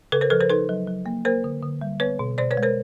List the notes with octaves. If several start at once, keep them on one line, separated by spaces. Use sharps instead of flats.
C#3 A4 B4
A#4 C5
F3 A4 B4
A#4 C5
D#4 A4 B4
F#3
F#3
A#3
A#3 A#4 C5
D3
D3
G3
B3 B4 C#5
B2
B2 C5 D5
B4 C#5
G#3
A#4 C5